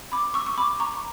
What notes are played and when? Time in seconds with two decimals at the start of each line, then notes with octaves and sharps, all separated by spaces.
0.12 B5 D6
0.34 C#6 E6
0.46 C#6
0.58 B5 D6
0.80 A#5 C#6